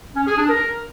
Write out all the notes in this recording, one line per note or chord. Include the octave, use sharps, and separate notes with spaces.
C#4
G#4
D4
A#4